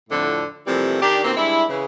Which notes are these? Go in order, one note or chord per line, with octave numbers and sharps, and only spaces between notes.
F2 A2 D3
C3 E3 F3 G3 A3 A#3
D#3 D4 G4
B2 D#3 A#3 C4
G2 G#3 D4 E4
C#3 E3